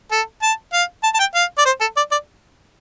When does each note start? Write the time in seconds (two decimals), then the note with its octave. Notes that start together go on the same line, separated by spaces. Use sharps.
0.12 A4
0.43 A5
0.73 F5
1.04 A5
1.14 A5
1.19 G5
1.35 F5
1.58 D5
1.66 C5
1.81 A4
1.97 D5
2.12 D5